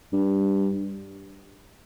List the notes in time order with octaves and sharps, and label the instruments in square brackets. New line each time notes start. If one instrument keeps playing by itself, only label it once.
[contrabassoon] G2